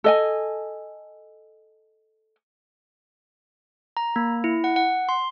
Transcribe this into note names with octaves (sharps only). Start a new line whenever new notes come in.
A4 D#5 G#5
A#5
A#3
E4
F#5
F#5
C6